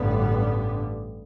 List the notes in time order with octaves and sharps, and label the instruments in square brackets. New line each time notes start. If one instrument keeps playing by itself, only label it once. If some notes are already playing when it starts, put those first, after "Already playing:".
Already playing: [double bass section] A1 G2 D3 G3 B3